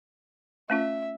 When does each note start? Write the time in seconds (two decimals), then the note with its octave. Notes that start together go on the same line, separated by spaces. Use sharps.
0.70 A3 C#4 F4 E5